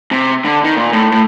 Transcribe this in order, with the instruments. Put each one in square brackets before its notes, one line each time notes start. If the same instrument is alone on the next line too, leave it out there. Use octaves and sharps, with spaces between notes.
[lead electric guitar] C3
D3
D#3
A#2
A2
A2